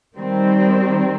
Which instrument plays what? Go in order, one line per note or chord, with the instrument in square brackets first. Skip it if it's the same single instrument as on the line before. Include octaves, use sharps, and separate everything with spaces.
[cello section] D#3 G3 C4